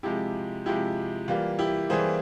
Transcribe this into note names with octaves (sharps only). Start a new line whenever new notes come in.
C3 F3 G#3 E4 G4
C3 F3 G#3 E4 G4
E3 G3 A#3 F4
E4 G4
E3 G3 A#3 G#4 C5